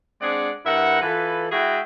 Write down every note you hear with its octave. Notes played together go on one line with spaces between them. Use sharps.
G#3 C4 D4 G#4 D5 F#5
G2 E4 A#4 E5 F#5
E3 F4 A4 B4
G#3 E4 F#4 G#4 E5 G5